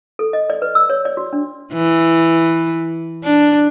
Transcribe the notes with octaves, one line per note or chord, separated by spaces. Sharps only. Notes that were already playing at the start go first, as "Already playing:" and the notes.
A4
D#5
D5
B4
E6
C#5
D5
F#4
D4
E3
D4